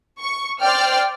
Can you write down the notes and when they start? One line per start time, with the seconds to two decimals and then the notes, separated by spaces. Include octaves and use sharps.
0.21 C#6
0.61 C5 D5 G5 F6